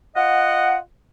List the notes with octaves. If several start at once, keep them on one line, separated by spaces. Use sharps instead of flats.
F4 D#5 F#5